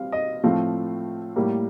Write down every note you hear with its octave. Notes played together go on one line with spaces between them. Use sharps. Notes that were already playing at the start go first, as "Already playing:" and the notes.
Already playing: G3 C4 F5
D#5
A2 F3 A3 C4 F5
A2 G3 A#3